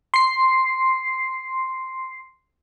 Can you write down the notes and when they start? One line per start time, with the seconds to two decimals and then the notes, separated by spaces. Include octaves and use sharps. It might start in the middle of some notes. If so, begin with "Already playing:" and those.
0.14 C6 C7